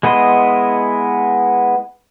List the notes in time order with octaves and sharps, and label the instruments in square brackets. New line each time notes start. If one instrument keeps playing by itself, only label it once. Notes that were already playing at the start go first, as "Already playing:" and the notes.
[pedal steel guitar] G#3 B3 E4 D#5 C6